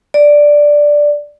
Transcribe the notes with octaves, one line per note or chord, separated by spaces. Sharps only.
D5